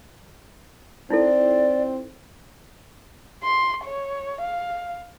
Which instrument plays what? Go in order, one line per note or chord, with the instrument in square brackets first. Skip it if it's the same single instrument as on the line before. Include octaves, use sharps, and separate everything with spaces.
[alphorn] C4 [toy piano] D#4 E4 A4 [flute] D5
[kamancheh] C6
C#5
F5